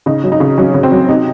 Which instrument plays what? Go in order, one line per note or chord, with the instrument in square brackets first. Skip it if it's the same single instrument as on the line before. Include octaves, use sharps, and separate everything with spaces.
[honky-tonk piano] C#3 D#4
F#3
D#4
C#3
F#3 C#4
C#3
C4
F#3
C3 D#4